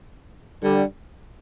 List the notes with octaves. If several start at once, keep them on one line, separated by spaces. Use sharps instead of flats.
D3 G3